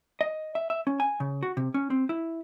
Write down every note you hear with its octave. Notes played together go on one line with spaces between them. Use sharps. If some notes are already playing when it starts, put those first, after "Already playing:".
D#5
E5
E5
C#4
G#5
C#3
F#4
C3
C#4
C4
E4